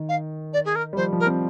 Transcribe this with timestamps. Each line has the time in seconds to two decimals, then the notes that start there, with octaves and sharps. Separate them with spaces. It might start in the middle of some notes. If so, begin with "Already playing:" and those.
Already playing: D#3
0.09 F5
0.53 D5
0.65 G#4
0.76 A#4
0.93 G3
0.97 F3 C5
1.13 F3
1.20 A#4
1.26 C4